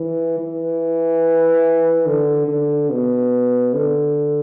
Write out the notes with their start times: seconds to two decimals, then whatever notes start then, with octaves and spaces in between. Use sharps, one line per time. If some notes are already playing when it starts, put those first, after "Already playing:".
Already playing: E3
0.39 E3
2.06 D3
2.48 D3
2.90 B2
3.74 D3